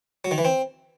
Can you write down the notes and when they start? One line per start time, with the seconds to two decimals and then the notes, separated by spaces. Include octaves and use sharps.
0.25 F#3
0.31 D#3
0.38 E3
0.45 C4